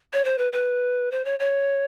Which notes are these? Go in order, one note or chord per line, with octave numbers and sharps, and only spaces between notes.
C#5
C5
B4
B4
C5
C#5
C#5